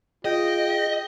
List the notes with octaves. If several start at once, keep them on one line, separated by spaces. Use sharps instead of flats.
F4 G#4 D#5 G5